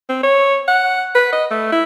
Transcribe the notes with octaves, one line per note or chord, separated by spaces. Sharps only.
C4
C#5
F#5
B4
D#5
A3
E4